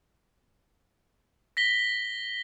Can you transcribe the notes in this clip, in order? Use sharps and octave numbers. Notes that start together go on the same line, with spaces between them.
A#6 B6 G7